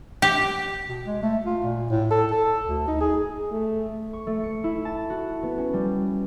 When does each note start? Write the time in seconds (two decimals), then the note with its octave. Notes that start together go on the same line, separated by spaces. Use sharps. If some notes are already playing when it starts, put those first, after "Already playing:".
0.22 G4
0.89 B2
1.05 G#3
1.23 A3
1.46 F4
1.63 A#2
1.90 A2
2.11 A4
2.31 A4
2.67 D2
2.88 D#4
3.00 G#4
3.52 A3
4.13 C#6
4.27 A3
4.44 C#7
4.64 E4
4.85 A5
5.10 F#4
5.43 B3
5.58 C#4
5.74 G3